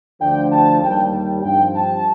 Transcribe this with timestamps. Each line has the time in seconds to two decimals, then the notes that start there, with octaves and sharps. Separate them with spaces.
0.21 D2 D3 F3 G5
0.52 A5
0.82 D#2 D#3 G3 G5
1.43 G2 F3 C4 G5
1.74 A5